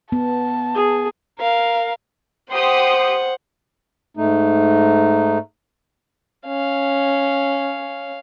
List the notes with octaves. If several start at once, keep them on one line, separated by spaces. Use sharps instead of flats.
B3 A5
G#4
A#4 F5
G4 C5 F#5 C6 D#6
G#2 A3 D#4
C#4 F5